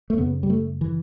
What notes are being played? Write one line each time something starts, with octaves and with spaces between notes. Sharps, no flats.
A3
F#2 C#3 B3
G3
A3
E3